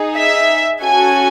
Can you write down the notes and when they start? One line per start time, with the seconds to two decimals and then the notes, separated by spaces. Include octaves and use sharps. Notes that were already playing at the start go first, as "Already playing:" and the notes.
Already playing: D#4 G#4
0.16 E5
0.82 C#4 F#4 A4 G#5